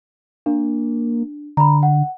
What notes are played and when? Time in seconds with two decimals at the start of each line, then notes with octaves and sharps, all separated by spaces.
0.46 A#3 D4
1.57 D3 A#5 B5
1.83 F#5